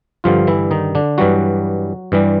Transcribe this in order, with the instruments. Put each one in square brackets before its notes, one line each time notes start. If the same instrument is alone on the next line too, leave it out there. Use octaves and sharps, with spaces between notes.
[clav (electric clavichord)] G2 D3 F3 G3 F4
E3 E4
D#3 D#4
D3 D4
G2 E3 F#3 G3 F#4
G2 E3 G3